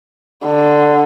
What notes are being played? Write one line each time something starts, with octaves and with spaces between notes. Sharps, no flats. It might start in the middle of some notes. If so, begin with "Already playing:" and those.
D3